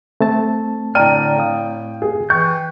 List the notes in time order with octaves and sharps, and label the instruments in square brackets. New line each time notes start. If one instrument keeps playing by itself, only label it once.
[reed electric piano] A3 C4 A5
[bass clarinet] A2 [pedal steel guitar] D3 A#5 F6 [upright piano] D5 G5 D#7
[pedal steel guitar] F5 D#6
[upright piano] G#4
[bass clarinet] E3 [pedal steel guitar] G5 F#6 G6 [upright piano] C#6